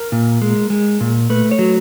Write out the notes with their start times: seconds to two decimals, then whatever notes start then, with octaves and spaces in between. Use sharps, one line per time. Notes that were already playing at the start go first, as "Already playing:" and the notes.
Already playing: A#4
0.12 A#2
0.42 G#3
0.70 G#3
1.01 A#2
1.30 A3 B4
1.51 C#5
1.59 F#3